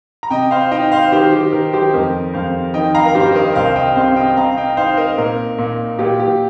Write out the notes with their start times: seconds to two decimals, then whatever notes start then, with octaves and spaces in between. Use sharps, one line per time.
0.23 A#5
0.31 C3 D#5 G5
0.51 C5 F5
0.71 D#4 D#5 G5
0.92 C5 F5
1.12 D#3 G4 C5
1.33 G4
1.52 D#3 A#4
1.73 G4 C5
1.94 F2 A#4 D#5
2.33 F2 C5 F5
2.74 D#3 D#5 G5
2.95 F5 A#5
3.05 A#4
3.15 G2 G4 C5
3.35 A#4 D#5
3.55 C2 C5 F5
3.76 D#5 G5
3.96 C3 C5 F5
4.16 D#5 G5
4.37 C4 F5 A#5
4.57 D#5 G5
4.77 D#4 C5 F5
4.97 A#4 D#5
5.18 A#2 A#4
5.58 A#2
5.99 A#2 G4
6.20 G4